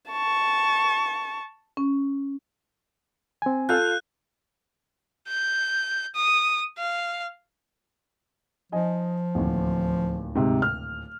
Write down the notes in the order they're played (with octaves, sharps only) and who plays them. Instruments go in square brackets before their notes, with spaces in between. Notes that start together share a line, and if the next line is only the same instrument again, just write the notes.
[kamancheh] A5 C#6
[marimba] C#4
[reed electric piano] C4 G#5
[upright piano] F4 A4 F5 [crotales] F#6 G6
[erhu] G6
D#6
F5
[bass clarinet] F3 [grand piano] D#4 D#5 G#5
[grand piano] D1 D#2
[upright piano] G#2 C3
F6